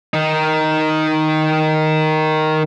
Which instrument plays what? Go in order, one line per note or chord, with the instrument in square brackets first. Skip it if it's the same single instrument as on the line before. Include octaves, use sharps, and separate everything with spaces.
[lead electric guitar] D#3 D#4